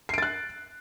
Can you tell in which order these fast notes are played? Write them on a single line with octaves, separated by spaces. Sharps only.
C7 D7 A6 F#6